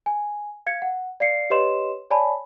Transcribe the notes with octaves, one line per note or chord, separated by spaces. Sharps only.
G#5
F5 G#6 C#7
F#5
D5 F5 C7 C#7
G4 B4 C#5 D#5 C6 E7
C#5 D5 G#5 A5 B5